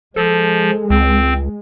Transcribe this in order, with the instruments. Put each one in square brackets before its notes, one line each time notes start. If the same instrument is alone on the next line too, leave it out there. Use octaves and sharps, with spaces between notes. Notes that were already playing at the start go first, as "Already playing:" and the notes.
[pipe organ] F3 [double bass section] G#3 [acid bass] A4
[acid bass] C#2 [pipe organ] C4